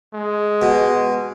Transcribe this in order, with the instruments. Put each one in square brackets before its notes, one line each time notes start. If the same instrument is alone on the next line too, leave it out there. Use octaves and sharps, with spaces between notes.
[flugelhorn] G#3
[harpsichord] B2